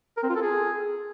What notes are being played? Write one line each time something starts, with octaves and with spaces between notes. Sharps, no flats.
A#4
C4
F4
A4
G#4